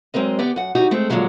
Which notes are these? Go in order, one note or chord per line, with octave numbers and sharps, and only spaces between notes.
F#3 G#3 C4 A#4 D#5
D3 B3 G4 D5
F#2 F#5
D2 E3 G3 D#4 F#4
G#3 A3 C4
A#2 D3 D#3 F3 F#3 G#3